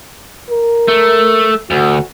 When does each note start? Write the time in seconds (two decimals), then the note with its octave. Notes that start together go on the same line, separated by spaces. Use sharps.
0.50 A#4
0.88 A3
1.71 D2 F#4